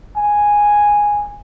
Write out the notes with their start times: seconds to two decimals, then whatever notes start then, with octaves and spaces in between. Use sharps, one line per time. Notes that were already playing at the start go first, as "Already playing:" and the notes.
0.17 G#5